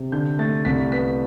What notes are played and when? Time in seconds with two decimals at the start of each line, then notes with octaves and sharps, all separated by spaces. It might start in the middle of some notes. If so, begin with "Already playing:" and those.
Already playing: C3
0.12 D3 G6
0.39 A3 A6
0.65 C2 B6
0.92 B3 B6